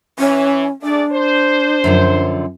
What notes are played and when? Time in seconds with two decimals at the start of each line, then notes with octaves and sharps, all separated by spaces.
0.19 E3 C#4
0.82 A3 D4 G#4 D5
1.12 C5
1.84 F#2 D3 F3